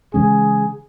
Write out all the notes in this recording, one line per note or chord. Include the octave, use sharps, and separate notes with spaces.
C#3 E3 G#3 C#4 G#4